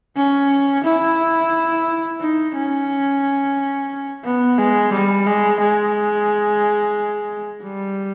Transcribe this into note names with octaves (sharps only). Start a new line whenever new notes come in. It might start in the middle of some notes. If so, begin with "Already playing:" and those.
C#4
E4
D#4
C#4
B3
G#3
G3
G#3
G#3
G3